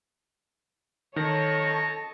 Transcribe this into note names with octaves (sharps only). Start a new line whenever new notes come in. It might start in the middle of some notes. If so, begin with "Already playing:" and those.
D#3 A4 C#5 D#5 A5 A#6